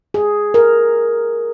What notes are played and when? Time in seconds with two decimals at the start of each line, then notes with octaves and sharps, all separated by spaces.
0.14 G#4
0.54 A#4